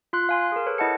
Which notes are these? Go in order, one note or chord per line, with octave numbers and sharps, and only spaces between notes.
F4 C6 F#6
F5 G#5 C6
G#4 A#4
A4 B4 C#5
E4 D#5 F#5 A5 C#7